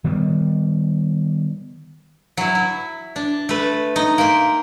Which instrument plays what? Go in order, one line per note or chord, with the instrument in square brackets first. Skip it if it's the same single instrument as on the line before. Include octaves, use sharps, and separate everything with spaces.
[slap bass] D#3 G3 B3
[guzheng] F#3 E4
E4
D4
A3 B4
D#4
A#3 G5 B5 C6